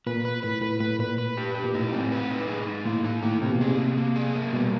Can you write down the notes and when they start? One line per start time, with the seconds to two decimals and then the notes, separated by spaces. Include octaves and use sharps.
0.07 A#2 B4
0.25 B4
0.43 A2 B4
0.62 A2 B4
0.80 A2 B4
0.99 A#2 B4
1.18 B4
1.37 G4
1.55 G4
1.65 A#2
1.75 A2 D#4
1.92 C4
2.12 B4
2.31 D#4
2.48 G#4
2.67 D#4
2.86 A2 A#3
3.04 D#4
3.23 A2 A#3
3.42 C3 A#3
3.51 B2
3.60 C3 G#4
3.79 A#3
3.98 A#3
4.16 G#4
4.36 A#3
4.53 B2 G3